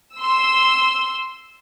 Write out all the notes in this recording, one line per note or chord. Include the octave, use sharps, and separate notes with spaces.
C6 E6